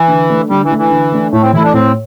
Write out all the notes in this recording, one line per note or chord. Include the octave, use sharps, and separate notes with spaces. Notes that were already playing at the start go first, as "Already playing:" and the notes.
Already playing: E3
D3
A3 D4
D3 G3
E3
A3 D4
E3
D3
A3 D4
A2 A3
C4
E3 A3 E4
D4
A2 C4